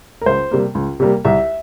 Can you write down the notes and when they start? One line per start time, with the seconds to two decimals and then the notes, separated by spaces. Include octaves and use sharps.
0.21 A#4
0.26 C#2 C5
0.51 C3 G3 A#3
0.75 C#2
1.00 C3 G3 A#3
1.25 C2 E5